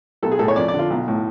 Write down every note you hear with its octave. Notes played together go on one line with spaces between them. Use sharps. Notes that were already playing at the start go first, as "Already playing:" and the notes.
B1 A4
G#4
A2 A4
C#5
F2 D5
D5
D3
F4
B1
A2